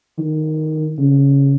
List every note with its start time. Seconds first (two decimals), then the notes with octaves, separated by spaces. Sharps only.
0.19 D#3
0.98 C#3